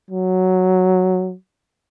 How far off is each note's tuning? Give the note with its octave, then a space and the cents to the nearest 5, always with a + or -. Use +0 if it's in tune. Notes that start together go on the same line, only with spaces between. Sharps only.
F#3 +0